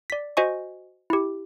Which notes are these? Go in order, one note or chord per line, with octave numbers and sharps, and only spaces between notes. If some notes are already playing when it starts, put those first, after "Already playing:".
D5 B6
F#4 C5 D#5 G#5 C#6
E4 G4